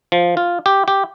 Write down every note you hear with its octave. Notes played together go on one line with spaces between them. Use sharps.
F3
F4
G4
G4